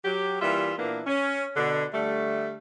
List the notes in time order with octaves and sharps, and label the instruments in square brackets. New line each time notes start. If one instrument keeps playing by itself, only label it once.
[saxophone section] F#3 G4
E3 G3 A#3 F4 E5
A#2 E3 A#3 B3 D4
C#4
B2 D3
D3 G3 A3